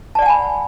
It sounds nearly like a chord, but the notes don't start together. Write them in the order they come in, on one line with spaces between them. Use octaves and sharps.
A5 D5 F#5 G#5 B5